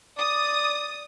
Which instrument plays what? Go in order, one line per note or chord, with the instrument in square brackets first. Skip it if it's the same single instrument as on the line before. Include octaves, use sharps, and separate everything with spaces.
[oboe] D5 [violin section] D#6